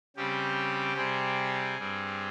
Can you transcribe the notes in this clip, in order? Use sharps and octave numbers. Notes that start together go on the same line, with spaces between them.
C#3 G3 C4 G4
C3 G3 C4 G#4
G2 G3 C4